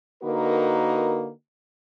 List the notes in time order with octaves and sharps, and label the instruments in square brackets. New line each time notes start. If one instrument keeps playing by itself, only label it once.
[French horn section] D3 A#3 D#4 F#4 A#4 B4